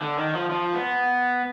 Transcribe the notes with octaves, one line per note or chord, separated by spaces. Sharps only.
D3
D#3
F3
F3
B3